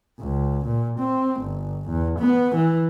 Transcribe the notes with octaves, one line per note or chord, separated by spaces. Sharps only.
C#2
A#2
C4
G1
E2
B3
E3